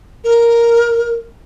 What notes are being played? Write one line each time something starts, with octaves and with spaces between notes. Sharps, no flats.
A#4